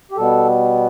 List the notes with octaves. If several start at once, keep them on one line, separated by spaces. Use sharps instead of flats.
G4
B2 G3 B3 A4